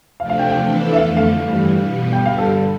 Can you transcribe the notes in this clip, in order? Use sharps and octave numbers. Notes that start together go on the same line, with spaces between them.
C3 F3 A3 D4 F5
F5
G5
G5
E3 B3 D4 A4
E5
F2 D3 A3 F5
F5
G2 E3 G3
B2 G3 B3
G2 D3 G3 G5
F5
A4